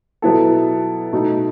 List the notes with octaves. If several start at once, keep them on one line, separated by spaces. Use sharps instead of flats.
B2 F#3 B3 E4 A4
B2 A3 D#4